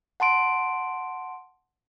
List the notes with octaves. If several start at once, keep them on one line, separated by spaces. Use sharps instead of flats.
F#5 A5 C6 D7